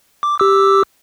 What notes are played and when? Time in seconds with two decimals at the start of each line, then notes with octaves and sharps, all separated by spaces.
0.23 D6
0.39 G4 D6 E6